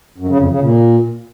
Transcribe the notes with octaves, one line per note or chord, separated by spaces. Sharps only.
F#2
C#3
F2
C#3
A#2